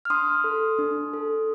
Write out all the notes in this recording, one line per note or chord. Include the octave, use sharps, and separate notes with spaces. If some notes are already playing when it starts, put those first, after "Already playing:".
F6
D4 C6 D#6
A4
D4
A4